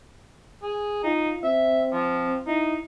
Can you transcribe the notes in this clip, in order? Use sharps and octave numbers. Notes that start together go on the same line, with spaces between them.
G#4
D#4 F4
C4 E5
F3
D#4 E4